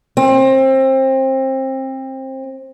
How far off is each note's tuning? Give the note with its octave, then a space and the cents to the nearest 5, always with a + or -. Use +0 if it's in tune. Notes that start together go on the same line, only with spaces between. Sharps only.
C4 +25